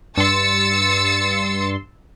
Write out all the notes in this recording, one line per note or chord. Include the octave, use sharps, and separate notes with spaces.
G2 C6 E6 A6 C#7